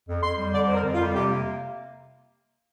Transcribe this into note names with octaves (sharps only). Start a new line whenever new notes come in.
F2
F2 C6
G3
D3 D5
F2 C5
A#4
F2
F4
G3
C3 G4
A#3